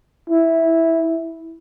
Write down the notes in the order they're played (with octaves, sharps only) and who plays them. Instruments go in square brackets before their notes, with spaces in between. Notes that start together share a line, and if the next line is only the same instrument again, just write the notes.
[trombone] E4